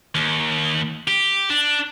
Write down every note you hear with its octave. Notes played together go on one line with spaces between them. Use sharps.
D#2
G4
D4